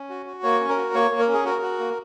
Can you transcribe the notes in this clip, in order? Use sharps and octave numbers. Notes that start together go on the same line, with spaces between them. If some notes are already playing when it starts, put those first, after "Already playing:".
Already playing: C#4
F#4
F#4
A#3 C#5
C#4
A#4
F#4
A#3 C#5
A#3
A#4
C#4
G#4
F#4 A#4
F#4
A#3